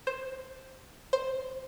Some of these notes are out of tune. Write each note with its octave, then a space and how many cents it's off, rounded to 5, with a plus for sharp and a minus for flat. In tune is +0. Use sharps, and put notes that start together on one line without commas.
C5 +10
C5 +5